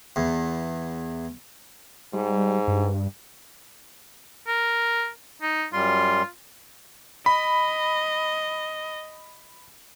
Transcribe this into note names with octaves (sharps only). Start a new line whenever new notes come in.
E2
G#2 G3
G2
A#4
D#4
F#2 G3 F4 C6
D#5 B5